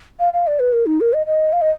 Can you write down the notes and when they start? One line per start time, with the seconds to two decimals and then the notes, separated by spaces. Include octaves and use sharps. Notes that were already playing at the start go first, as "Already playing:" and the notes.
0.20 F5
0.33 F5
0.47 D5
0.60 B4
0.73 A#4
0.86 D#4
1.01 A#4
1.13 D#5
1.26 D#5
1.53 F5
1.61 D#5